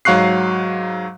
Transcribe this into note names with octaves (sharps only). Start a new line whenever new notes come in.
G#2 F#3 F5 C#6 F#6 C7